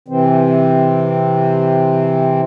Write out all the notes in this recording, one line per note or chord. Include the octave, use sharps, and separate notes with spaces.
C3 E3 C4